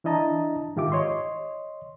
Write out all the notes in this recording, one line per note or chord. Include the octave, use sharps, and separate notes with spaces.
E3 D4 E4 D#5 A5 A#5
G#2 D#3 F4 G4 E5 D6
C#5 D#5 C6